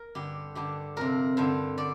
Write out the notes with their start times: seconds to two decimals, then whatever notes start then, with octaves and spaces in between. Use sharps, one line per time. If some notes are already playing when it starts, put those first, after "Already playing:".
Already playing: A#4
0.15 G2 D3 G4
0.55 G2 D3 G4
0.96 F2 C3 A#4
1.37 G2 D3 C5
1.78 D3 D5